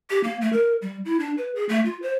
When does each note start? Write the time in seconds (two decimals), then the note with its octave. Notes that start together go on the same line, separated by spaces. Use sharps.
0.10 G4
0.24 A#3
0.41 A3
0.53 A#4
0.82 G3
1.05 E4
1.20 D4
1.38 B4
1.55 G#4
1.69 A3
1.85 F4
2.02 C5